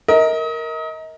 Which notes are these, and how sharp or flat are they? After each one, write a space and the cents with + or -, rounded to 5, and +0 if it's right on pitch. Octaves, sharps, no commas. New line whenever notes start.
A#4 +0 D#5 +35